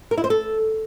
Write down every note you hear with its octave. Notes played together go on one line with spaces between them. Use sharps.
A#4
E4
C5
A4